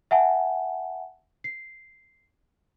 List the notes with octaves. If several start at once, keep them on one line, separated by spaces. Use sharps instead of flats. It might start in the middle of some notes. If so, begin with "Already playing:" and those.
E5 F#5 G#5 A5
C7